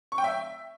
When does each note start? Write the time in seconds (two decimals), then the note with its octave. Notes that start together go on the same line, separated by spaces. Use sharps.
0.12 C#6
0.18 G5
0.24 E5